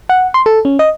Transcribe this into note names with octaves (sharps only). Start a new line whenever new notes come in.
F#5
C6
A4
C#4
D#5